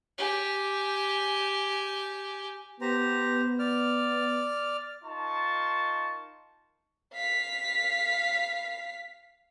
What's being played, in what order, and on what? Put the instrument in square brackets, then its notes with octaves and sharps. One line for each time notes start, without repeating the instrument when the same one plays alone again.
[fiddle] G4 G#5
[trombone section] B3 [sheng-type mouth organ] G4 C5 A#5
[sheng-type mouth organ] D5 F6
[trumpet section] D#4 F4 A#4 A5 C6 C#6
[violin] F5 B6